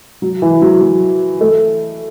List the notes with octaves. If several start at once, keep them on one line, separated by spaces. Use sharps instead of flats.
F#3
E3
F#3
F#3
A3